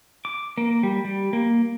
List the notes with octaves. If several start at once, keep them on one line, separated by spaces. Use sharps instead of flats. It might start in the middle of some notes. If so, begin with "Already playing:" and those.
D6
A#3
G3
G3
A#3